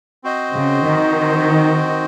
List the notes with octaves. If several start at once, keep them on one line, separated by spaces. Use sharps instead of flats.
C4 F#4 C5 D#5
C#3
D#3